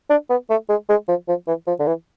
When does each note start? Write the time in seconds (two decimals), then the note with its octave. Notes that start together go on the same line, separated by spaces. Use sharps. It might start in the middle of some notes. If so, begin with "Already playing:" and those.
0.10 D4
0.30 B3
0.50 A3
0.69 G#3
0.89 G#3
1.08 F3
1.28 F3
1.48 E3
1.67 F3
1.80 D3
1.87 E3